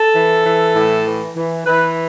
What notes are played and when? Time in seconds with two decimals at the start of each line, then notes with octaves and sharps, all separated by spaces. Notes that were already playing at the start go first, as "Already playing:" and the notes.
Already playing: A4
0.13 E3
0.44 E3
0.74 A2
1.05 E3
1.35 E3
1.65 E3 B4